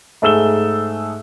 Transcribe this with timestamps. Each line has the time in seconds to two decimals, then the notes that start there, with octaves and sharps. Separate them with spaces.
0.22 G#2 A3 G#4 E6 E7 G7